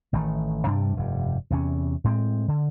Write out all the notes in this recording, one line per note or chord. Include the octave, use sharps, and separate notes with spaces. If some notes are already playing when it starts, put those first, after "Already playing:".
A1 D#3 E3 A3
G2 C3 G3 D4
F1 G2
E2 C3 C#4
A2 G#3 C4
D3